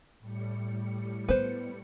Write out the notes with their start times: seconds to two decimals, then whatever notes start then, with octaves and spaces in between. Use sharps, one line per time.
0.20 A2 G3 C#7
1.28 B3 B4 C5